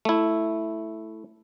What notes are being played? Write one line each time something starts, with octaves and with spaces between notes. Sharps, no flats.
A3 E4